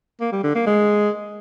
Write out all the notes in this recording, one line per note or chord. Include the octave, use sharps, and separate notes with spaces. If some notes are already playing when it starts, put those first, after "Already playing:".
A#3
G3
D3
A#3
G#3